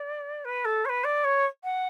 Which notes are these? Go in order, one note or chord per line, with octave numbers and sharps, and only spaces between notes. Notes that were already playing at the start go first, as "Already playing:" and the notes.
Already playing: D5
B4
A4
C#5
B4
D5
C#5
F#5